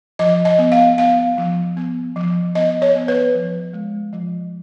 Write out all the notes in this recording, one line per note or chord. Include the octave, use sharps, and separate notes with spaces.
F3 D#5
D#5
B3
F5
B3 F5
F3
B3
F3
B3 D#5
C#5
B3
B4
F3
G#3
F3